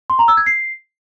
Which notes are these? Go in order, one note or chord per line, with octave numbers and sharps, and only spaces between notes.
C6
A#5
E6
G#6
C7